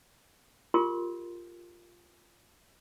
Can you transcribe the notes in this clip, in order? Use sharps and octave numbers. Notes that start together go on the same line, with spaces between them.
F4 G4 G#4 A#4 C6